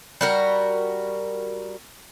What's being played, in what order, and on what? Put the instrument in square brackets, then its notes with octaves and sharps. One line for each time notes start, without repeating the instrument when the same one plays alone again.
[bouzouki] G3 F#4 A#4